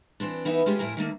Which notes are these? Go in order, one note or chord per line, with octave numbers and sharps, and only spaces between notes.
E3 C4 D4
E3 B3 D#4 E5
G#3 A3 C#4 F4 G4 G#4
F2 A2 E4 A#4 G#5
D#3 A3 A#3